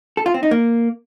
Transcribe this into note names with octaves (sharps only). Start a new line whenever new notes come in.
A4
F4
C4
D#4
A#3